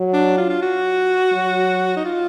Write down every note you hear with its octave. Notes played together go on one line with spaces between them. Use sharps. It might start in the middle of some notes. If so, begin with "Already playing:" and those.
Already playing: F#3
D4
F4
F4
F#4
F#3
D#4
F4